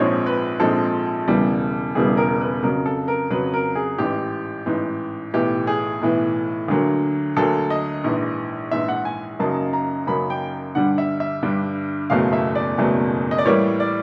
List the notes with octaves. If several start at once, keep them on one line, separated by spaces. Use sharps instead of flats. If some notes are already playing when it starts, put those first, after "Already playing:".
Already playing: A#1 G#2 F3 G#3 C4 C#5
B4
A#1 G#2 F3 G#3 C4 A4
E1 E2 C#3 E3 G3
E1 E2 C#3 E3 G3 G#4
A#4
B4
F2 C#3 F#3 A#4
A4
A#4
F2 C#3 F#3 B4
A#4
G#4
A1 G#2 E3 G4
A1 G#2 E3
B1 A2 E3 G4
G#4
B1 A2 E3
D2 D3 F#3 A#3
D2 D3 F#3 A#3 A4
D#5
A#1 G#2 E3
A#1 G#2 E3 E5
F#5
G#5
F#2 C#3 F#3 A#3 D#4 A5
A#5
F#2 C#3 F#3 A#3 D#4 B5
G5
G2 D3 G3 F#5
E5
E5
G2 D3 G3
F#1 E2 B2 F#3 A3 F5
E5
D5
F#1 E2 B2 F#3 A3
D#5
D5
A2 E3 G3 A#3 C#5
D5